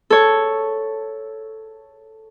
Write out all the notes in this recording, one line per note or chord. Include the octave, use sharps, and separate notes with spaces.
A4 C#5